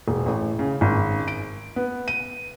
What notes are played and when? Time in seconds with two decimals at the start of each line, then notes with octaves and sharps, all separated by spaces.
0.08 E1
0.26 A1
0.59 C#3
0.81 G#1
1.28 D7
1.76 B3
2.08 D#7